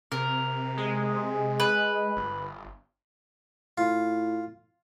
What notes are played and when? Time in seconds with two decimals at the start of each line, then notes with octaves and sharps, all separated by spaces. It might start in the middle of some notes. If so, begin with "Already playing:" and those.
0.12 C3 A#4
0.77 G#3
1.60 B4
2.16 G1
3.78 A2 F4